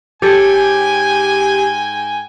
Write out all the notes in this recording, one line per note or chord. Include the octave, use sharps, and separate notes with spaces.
G#2 G4 A4 C#5 G5 G#5